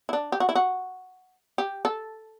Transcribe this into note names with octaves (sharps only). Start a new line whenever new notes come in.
E4
D4
G4
F#4
E4
F#4
G4
A4